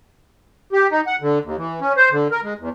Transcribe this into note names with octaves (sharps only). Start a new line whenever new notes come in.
G4
D#4
F#5
D3
D#2
E3
C#4
C5
D3
A#4
G#3
E2